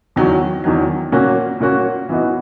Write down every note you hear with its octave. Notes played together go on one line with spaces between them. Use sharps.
E2 D#3 F#3
E2 D#3 F#3
A#2 A#3 C#4 F#4
A#2 A#3 C#4 F#4
E3 B3 D#4 F#4